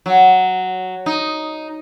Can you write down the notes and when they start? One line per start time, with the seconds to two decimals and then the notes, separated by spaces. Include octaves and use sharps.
0.06 F#3
1.06 D#4